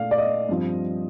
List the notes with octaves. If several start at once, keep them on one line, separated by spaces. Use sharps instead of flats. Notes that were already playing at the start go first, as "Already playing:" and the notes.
Already playing: A#2 A3 D4 F5
D5
D#5
G2 F3 C4